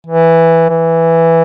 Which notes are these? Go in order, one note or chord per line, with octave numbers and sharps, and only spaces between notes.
E3
E3